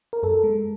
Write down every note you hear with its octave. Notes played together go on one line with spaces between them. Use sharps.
A#4
F#2 A4
G#3